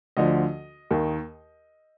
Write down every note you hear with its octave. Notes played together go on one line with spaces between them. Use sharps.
D2 D3 F3 D#5
D#2 D#3